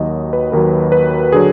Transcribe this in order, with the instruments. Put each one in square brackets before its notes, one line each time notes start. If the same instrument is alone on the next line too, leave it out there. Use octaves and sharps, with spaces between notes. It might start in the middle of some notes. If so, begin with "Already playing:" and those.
Already playing: [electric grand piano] D#2 D#3 F#3 D#5
B4
D#2 D#3 F#3 A#4
B4
D3 F#3 G#4